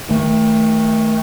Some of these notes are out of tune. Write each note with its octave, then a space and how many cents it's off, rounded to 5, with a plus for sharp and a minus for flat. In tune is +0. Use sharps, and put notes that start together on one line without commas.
D#3 +35 A3 +0